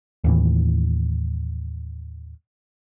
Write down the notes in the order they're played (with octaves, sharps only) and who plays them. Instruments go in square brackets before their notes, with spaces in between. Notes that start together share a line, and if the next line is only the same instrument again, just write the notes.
[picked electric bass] D#2 A2 E3